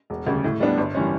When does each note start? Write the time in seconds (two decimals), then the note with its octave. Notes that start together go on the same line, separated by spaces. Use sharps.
0.10 E1
0.27 D2 C#3 G3
0.44 A2
0.60 G3 B3 D4
0.78 G1
0.95 E3 G3 C#4